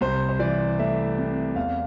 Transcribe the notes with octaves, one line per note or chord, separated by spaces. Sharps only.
C2 C5
C5
E3 D5
A3 E5
C3
E2 F5